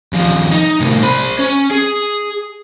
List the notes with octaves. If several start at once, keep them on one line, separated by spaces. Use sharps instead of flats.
D#2 F3
D#4
A2 C3
C5 B5
C#4
G#4